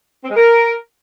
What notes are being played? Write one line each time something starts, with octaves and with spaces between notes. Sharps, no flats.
C4
G#3
A#4